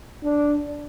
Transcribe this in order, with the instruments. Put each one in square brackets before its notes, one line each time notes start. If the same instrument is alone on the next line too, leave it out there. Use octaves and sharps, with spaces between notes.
[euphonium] D4